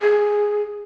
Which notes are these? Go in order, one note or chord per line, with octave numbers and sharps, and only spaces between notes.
G#4